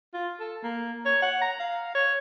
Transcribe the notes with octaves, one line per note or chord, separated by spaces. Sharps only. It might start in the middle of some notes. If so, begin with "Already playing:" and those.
F4
A4
A#3
C#5
F#5
A#5
F5
C#5